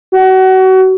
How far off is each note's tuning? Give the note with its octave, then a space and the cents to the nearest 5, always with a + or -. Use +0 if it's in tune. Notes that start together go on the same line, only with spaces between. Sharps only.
F#4 +30